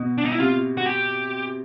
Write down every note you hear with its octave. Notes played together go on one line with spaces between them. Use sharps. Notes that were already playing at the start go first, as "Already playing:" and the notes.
Already playing: B2
D4
D#4
E4
C3 F4
F#4
G4